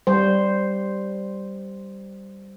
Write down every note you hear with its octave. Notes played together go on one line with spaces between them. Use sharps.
G3 C5